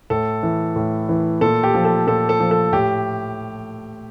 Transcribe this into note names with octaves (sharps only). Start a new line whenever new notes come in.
A2 A4
E3
A2
E3
A#2 A4
G4
F3
A4
A#2 A4
A4
F3
A4
A2 G4